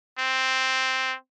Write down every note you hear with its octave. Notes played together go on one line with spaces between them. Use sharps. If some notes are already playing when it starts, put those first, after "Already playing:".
C4